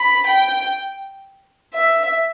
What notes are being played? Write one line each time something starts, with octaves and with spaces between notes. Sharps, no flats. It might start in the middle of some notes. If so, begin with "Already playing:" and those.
Already playing: B5
G5
E5